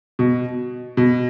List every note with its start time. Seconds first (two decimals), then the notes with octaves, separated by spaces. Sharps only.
0.19 B2
0.97 B2